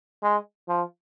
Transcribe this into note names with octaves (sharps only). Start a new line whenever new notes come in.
G#3
F3